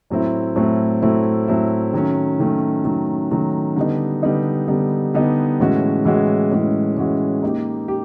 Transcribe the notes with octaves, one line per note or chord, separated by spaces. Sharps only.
A2 F#3 A3 C4 E4
A2 F#3 A3 C4 E4
A2 F#3 A3 C4 E4
A2 F#3 A3 C4 E4
D#3 F#3 A3 C#4
D#3 F#3 A3 C#4
D#3 F#3 A3 C#4
D#3 F#3 A3 C#4
D3 G3 B3 D#4
D3 G3 B3 D#4
D3 G3 B3 D#4
D3 G3 B3 D#4
A2 E3 G#3 C#4 F#4
A2 E3 G#3 C#4 F#4
A2 E3 G#3 C#4 F#4
A2 E3 G#3 C#4 F#4
A#3 D#4 G4
G4